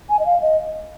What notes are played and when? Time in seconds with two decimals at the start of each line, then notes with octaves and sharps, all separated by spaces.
0.10 G#5
0.19 D#5
0.26 F5
0.42 D#5